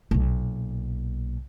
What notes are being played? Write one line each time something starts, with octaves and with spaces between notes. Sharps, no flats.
B1 A#2